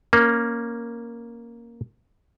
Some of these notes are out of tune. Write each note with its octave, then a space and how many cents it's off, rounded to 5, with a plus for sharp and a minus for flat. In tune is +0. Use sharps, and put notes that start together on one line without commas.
A#3 +0 C#4 +0